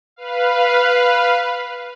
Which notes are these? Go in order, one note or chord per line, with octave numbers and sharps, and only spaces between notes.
B4 F5